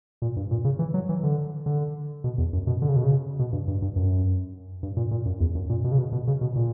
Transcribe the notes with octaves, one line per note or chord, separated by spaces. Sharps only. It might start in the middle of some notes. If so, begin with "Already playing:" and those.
A#2
G2
A#2
C#3
E3
F#3
E3
D3
D3
B2
E2
F#2
B2
D3
C#3
B2
C#3
B2
G2
G2
G2
F#2
G2
A#2
A#2
F#2
E2
F#2
A#2
B2
C#3
B2
B2
C#3
B2
A#2